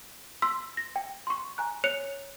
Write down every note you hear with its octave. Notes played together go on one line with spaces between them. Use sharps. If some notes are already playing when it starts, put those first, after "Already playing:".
C6 E6 B6
A#6
G5
C6 C#6
G#5 A#5 F#6
C#5 F#6 C#7 F7